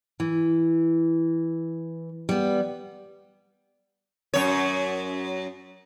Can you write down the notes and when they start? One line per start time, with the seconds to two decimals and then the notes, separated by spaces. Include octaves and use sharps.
0.20 E3
2.29 G3 B3
4.34 F#2 C#5